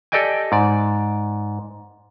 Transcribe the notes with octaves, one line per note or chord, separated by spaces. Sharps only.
G4 A4 D5 D#5 G5 G#5
G#2 D5